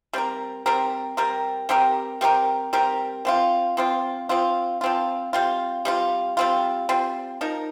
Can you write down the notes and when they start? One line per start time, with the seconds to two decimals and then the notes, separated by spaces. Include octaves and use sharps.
0.13 G3 C4 G4 A#4
0.66 G3 C4 G4 A#4
1.17 G3 C4 G4 A#4
1.69 G3 C4 G4 A#4
2.21 G3 C4 G4 A#4
2.73 G3 C4 G4 A#4
3.25 F3 C4 F4
3.77 F3 C4 F4
4.29 F3 C4 F4
4.81 F3 C4 F4
5.33 G3 C4 F4
5.85 G3 C4 F4
6.37 G3 C4 F4
6.89 G3 C4 F4
7.41 F3 D#4 A#4